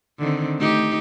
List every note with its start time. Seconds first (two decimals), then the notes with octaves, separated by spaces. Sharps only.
0.19 D3 D#3 C4
0.58 A3 D#4 G4